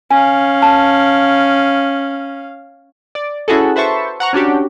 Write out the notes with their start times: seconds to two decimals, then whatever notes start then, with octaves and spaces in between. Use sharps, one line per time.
0.11 C#4 F5 G#5
0.62 A5
3.15 D5
3.48 C#4 E4 F#4 G#4 A4
3.76 B4 C5 E5 A5 C#6
4.20 F#5 A#5 C#6
4.33 C#4 D4 F#4 G4